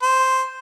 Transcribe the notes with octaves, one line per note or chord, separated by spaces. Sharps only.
C5